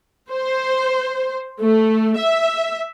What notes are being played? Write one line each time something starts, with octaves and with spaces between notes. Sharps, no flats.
C5
A3
E5